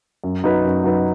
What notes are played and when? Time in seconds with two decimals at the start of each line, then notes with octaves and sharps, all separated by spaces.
0.24 F#2
0.44 F#3 D#4 B4
0.65 F#2
0.84 F#3 D#4 B4